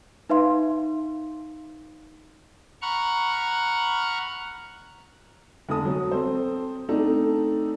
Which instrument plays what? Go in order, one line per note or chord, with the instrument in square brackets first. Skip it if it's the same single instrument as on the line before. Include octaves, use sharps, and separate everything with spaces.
[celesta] D#4 B4 E5 F5 C6
[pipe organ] F#5 A#5 B5 C#6 F6 F#6
[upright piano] F1 D3 A5 D#6
F#3
C4 A4 C5
A3 C4 D4 D#4 A4